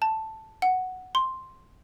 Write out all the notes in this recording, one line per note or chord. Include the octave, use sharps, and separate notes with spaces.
A5
F#5
C6